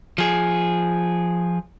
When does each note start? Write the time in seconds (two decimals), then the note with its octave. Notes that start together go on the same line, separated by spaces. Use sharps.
0.18 F3 G#4